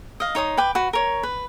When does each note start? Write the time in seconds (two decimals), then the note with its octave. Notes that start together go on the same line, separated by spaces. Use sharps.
0.20 D#5 F5
0.35 D#4 C#5 C6 D#6
0.57 B4 G5 D6
0.75 F#4 B4
0.93 A#4 C#5
1.23 B4